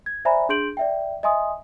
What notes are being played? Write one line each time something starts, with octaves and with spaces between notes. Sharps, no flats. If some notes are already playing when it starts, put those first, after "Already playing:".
G#6
C5 D5 E5 G#5 A#5 B5
D4 G#4 C6 G6 D7 F#7
D5 E5 G5
D#5 E5 G#5 C6 D#6